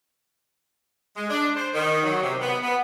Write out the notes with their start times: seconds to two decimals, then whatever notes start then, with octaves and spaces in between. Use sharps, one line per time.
1.16 G#3
1.30 D4
1.56 C5
1.75 D#3
2.04 F#3
2.23 C3
2.41 B3
2.63 B3